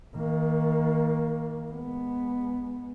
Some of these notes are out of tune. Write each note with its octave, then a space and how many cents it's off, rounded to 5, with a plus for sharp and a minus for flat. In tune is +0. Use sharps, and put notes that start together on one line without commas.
D#3 +30 A#3 +0
G#3 +0 B3 +0